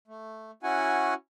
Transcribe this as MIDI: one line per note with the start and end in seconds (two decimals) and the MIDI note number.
0.08 0.51 57
0.63 1.14 61
0.63 1.14 64
0.63 1.14 66
0.63 1.14 78
0.63 1.14 80